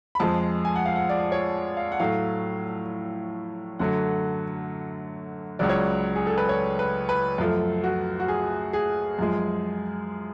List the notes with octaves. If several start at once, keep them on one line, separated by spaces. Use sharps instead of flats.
B5
F2 F3 G#3 A5
G#5
F#5
F5
F#5
D5
C#5
F5
F#5
A2 F#3 A3 F5
F#2 D3 F#3 A3 F#5
C#2 C#3 F#3 D5
C#5
D5
G#4
A4
B4
C#5
B4
B4
F#2 F3 A3
F#4
F#4
G#4
G#4
F#2 F3 G#3